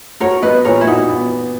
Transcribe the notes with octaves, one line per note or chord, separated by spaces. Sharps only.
F#4 A#4 C#5
B3 B4 D#5
A#2 A#4 C#5
E4
D#4 F#4
B3